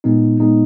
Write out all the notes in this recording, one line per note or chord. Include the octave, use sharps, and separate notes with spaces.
A#2 G#3 B3 D#4
A#2 G#3 B3 D#4